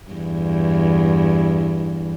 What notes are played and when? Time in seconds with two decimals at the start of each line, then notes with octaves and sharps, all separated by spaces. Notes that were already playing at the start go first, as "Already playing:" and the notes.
0.11 E2 G2